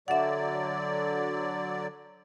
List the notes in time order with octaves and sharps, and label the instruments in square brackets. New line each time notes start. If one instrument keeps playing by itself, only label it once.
[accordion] D3 F#3 D5 [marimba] E5 F#5